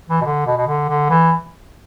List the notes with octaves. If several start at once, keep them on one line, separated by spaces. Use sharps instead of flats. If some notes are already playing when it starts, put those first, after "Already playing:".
E3
B2
D3
B2
B2
D3
D3
E3